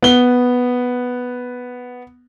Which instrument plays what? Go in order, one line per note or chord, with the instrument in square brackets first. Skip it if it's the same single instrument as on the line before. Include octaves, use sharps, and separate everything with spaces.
[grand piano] B3 G7